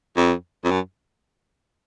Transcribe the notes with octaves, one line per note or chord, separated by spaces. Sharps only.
F2
F2
F#2